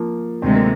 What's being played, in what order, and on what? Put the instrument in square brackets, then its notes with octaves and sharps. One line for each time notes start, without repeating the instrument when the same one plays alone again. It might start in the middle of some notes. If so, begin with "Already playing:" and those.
Already playing: [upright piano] F3 A#3
[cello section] D2 C3 D#3 G#3 [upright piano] C4
[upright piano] A#3